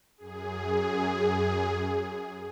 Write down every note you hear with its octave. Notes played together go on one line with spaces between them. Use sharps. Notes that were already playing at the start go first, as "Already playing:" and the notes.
F#2 G#4